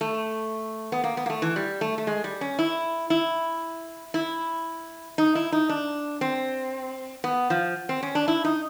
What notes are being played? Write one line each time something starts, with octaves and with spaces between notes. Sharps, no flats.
A3
B3
A#3
B3
A#3
A3
E3
G3
A3
A3
G#3
G3
C#4
E4
E4
E4
D#4
E4
D#4
D4
C4
B3
F3
C4
C#4
D4
E4
D#4